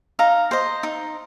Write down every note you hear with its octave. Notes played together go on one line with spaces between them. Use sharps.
D#4 F5 A#5
C5 D#5
D#4